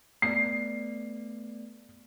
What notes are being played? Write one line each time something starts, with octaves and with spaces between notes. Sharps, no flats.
A3 B3 D5 C7